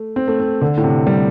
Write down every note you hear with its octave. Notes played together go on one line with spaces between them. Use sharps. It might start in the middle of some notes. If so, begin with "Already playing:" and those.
Already playing: A3
C4
A3
C4
D3
A2
C3
G3